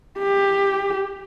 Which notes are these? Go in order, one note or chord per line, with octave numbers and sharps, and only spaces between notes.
G4